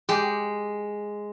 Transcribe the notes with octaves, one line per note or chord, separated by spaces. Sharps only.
G#3 G4